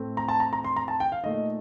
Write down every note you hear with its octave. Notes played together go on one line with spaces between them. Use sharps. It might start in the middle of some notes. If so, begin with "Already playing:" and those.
Already playing: A2 A3 C4
A#5
A5
A#5
A#5
C6
A#5
A5
G5
F5
A#2 A3 D#4 D#5